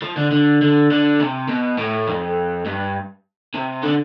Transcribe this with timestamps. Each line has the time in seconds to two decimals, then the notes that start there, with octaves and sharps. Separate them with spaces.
0.02 F3
0.17 D3
0.31 D3
0.62 D3
0.91 D3
1.20 C3
1.48 B2
1.78 A2
2.08 F2
2.66 G2
3.54 C3
3.83 D3